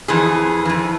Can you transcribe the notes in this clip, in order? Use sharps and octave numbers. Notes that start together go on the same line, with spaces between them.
F2 E3 G#4
F2 E3